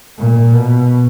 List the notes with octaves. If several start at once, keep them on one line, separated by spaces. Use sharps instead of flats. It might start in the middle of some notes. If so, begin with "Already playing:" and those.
A#2
B2